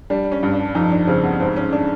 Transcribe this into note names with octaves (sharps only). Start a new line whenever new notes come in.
G3 D4
C#4
G2
D4
F2 D#4
D4
C#3 C4
B3
G#2 C4
C#4
D4